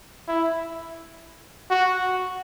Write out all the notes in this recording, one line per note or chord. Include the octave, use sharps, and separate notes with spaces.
E4
F#4